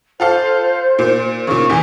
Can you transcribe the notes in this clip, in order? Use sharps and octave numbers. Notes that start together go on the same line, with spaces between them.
F4 A4 C5 F5
A#2
A#2 C#3 C#6
E2 C3 E3 G#5